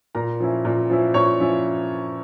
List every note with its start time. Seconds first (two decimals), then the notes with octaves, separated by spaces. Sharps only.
0.15 A#2 A#4 A#5
0.40 F3 C#4 E4
0.65 A#2
0.90 F3 C#4 E4
1.14 A#2 C#5 C#6
1.40 F3 C#4 E4